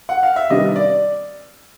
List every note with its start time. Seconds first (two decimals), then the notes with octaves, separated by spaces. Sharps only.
0.09 F#5
0.23 F5
0.36 E5
0.50 C3 D#3 G3 B3 D4 D#5
0.76 D5